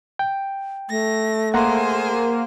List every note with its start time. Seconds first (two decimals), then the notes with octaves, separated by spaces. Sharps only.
0.19 G5
0.89 A3 A#6
1.54 A#3 G#4 C5 F#5 A#5 C6